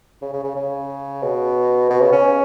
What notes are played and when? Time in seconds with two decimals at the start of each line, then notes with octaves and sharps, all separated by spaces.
0.22 C#3
0.34 C#3
0.44 C#3
0.56 C#3
1.23 B2
1.90 B2
2.02 C#3
2.12 C#4